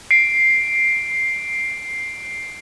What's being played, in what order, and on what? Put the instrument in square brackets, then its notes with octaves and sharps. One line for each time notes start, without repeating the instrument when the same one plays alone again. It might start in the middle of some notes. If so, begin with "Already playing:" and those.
[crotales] C7 D7